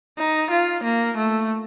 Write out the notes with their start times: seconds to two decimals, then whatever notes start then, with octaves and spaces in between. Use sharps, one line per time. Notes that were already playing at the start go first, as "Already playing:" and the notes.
0.18 D#4
0.51 F4
0.84 A#3
1.18 A3